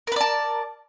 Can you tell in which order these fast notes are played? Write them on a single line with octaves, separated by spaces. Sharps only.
A#4 B4 D5 A5